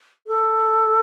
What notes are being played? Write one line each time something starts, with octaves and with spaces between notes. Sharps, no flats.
A4